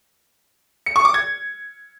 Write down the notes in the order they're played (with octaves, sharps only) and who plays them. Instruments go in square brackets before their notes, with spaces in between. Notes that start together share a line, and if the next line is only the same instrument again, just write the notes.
[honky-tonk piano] C#7
C#6
D6
G#6